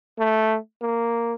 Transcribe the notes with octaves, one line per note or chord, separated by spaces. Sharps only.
A3
A#3